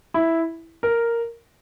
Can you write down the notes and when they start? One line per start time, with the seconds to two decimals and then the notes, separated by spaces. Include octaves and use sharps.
0.14 E4
0.83 A#4